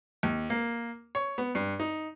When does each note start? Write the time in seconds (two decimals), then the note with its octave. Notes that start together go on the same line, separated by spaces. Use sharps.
0.23 D#2
0.50 A#3
1.15 C#5
1.38 B3
1.55 G2
1.80 D#4